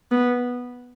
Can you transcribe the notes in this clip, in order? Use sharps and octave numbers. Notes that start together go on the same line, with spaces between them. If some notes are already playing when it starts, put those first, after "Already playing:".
B3